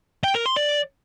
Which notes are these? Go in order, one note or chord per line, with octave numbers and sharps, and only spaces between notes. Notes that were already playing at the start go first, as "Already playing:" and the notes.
G5
A#4
C6
D5